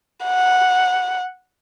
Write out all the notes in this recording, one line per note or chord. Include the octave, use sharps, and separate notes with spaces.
F#5